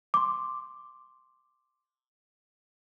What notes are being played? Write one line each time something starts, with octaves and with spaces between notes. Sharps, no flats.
C6 D6